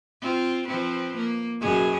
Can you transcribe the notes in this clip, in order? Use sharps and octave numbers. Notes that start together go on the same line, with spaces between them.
C4 F4
F3 C4 B4
A#3
F#2 B2 G#4